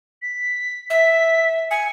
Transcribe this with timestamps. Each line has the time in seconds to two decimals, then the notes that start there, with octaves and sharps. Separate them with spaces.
0.22 B6
0.90 E5 B6
1.71 G#5 C#7